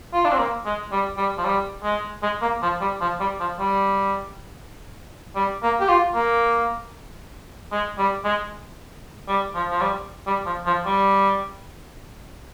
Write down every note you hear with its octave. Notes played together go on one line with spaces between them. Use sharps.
F4
D4
C4
A#3
G#3
G3
G3
F3
G3
G#3
G#3
A#3
F3
G3
F3
G3
F3
G3
G3
A#3
G4
F4
A#3
G#3
G3
G#3
G3
F3
F3
G3
G3
F3
F3
G3